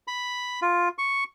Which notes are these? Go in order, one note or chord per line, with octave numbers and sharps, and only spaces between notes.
B5
F4
C#6